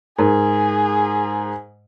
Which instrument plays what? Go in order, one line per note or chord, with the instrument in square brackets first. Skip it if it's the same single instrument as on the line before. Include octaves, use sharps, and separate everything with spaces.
[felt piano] G#2 [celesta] D#4 A#4 [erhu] G#4